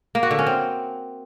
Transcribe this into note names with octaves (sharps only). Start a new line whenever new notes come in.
A#3
F#4
D3
C#4
C4